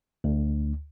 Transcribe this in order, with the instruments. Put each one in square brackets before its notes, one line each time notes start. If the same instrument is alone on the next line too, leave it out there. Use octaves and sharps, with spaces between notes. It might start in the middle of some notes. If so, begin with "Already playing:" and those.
[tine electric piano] D2